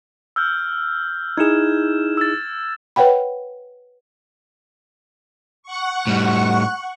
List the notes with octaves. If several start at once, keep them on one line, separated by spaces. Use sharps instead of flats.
E6 F6 G6
D#4 E4 G#4 G#6 E7
E6 A6
B4 C#5 F#5 G5 B5
F#5 C#6
A2 G3